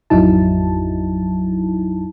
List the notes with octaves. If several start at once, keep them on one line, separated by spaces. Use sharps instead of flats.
A1 F2 F#3 D#4 E4 A5